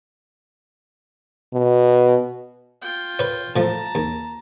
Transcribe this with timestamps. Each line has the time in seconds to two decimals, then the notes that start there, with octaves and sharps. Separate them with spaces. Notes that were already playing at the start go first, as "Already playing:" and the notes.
1.54 B2
2.82 F4 G5
3.19 B4 C#5
3.56 A2 F3 A5 A#5
3.95 D#2